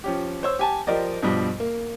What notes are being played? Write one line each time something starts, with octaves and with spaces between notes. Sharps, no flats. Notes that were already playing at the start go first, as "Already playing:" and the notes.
F3 C#4 G4
C5 C#5 E6
G4 G#5 A5
F3 G4 A#4 C5 D5 D#5
G2 B2 F3 G3
A#3